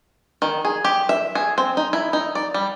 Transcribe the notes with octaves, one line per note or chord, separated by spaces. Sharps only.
D#3
G#4
G4
E5
G#4
C4
D#4
E4
D#4
D5
G3